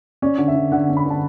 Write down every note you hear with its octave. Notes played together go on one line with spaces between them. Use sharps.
C#4 D5
D3
E5
D3
D3 F#5
C#4
B5
D3 A5